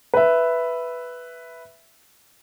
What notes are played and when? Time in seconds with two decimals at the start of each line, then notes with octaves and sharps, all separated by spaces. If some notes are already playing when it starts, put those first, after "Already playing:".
0.14 B4 E5